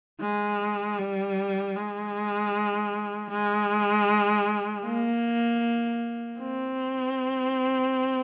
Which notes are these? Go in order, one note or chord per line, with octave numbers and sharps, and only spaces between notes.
G#3
G3
G#3
G#3
A#3
C4